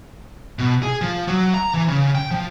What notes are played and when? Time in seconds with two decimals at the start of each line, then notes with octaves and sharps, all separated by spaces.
0.59 B2
0.83 G#4
1.02 F3
1.27 F#3
1.54 A#5
1.74 E3
1.88 C#3
2.15 G5
2.31 F3